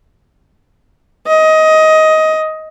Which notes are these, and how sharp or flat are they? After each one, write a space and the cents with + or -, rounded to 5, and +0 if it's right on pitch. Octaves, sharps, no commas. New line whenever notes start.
D#5 +15